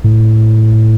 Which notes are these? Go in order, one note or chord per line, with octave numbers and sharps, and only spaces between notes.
A2